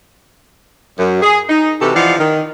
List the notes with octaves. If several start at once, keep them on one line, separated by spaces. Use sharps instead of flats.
F#2
G#4
D#4
C3 E3 F#4 G4 A4
E3 F3 D#4 D5 F5 F#5
D#3